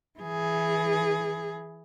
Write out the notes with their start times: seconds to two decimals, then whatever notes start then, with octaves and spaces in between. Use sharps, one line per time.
0.19 E3 G#4